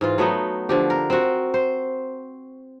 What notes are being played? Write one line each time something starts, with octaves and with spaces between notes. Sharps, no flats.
G#2 E3 F4
F#3 A3 B3 D#4
D3 F3 G4
A#4
C4 F#4
C5